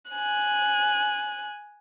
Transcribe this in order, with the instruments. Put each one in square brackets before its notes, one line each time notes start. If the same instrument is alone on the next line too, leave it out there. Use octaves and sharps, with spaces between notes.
[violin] G#5 F#6